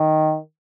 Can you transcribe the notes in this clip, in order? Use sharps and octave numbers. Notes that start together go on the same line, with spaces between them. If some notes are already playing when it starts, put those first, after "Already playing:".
Already playing: D#3